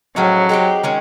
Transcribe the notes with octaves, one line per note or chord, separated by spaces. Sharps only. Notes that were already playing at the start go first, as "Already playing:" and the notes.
A2 F3 F#3 G#3 C#4
G#3 C4 D#4 G4
D#3 G#3 C#4